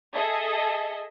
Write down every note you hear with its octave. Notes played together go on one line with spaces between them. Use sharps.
G#4 A4 D#5 E5